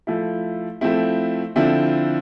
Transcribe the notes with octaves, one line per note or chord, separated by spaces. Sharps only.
F3 A3 E4
F3 A3 C4 E4
D3 F3 C4 E4